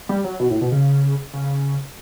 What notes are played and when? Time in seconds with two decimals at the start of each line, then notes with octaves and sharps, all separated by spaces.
0.09 G3
0.24 F#3
0.40 B2
0.50 A2
0.61 B2
0.72 C#3
1.33 C#3